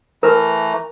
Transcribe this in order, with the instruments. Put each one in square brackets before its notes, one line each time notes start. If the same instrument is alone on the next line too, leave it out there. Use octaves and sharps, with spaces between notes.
[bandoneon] E3 A3 A#5 [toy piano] A#4 B4